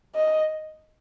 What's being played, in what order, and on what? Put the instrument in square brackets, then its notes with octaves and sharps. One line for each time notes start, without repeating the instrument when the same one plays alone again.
[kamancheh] D#5